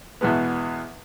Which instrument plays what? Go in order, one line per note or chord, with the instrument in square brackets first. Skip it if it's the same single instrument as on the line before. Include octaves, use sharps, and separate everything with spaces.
[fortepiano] E2 B2 E3 G#3 B3